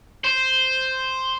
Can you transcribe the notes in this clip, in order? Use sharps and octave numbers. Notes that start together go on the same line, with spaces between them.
C5